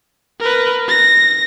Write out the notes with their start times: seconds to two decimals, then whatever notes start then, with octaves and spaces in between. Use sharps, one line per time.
0.40 A#4 B4
0.88 A#6